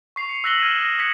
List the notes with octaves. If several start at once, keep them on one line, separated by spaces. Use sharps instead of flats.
C#6 C7 F7
C#7 F7
E6 F#6 A#6 B6 F#7 G7
F6 G#6 D#7 E7
D#6 A#6
D#6 F#6 G#6 B6 C#7